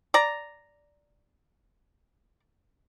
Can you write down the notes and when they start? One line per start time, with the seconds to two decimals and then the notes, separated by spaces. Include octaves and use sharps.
0.14 D5 A#5